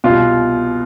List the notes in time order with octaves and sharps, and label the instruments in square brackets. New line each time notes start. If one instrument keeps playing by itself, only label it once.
[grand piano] C2 B2 F4